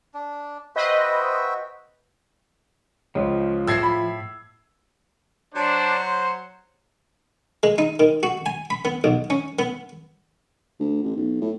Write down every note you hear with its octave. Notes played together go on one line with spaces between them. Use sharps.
D4
F#4 B4 C5 D#5 E5 G5
C#2 F3 C#4
A2 E5 E6 G#6 C7
B5
F#3 D4 C5
C5
G#3
D#4
D#3
F#4
G#5
B5
B3
B1
C#4
B3
D2
A1
B1
A2